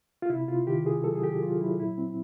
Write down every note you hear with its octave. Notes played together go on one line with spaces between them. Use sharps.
F4
C3 E4
C3 F4
D#3 G4
C3 G#4
F#3 A4
G#4
D#3 G4
F#3 F4
F#3 E4
A#2 E4
C4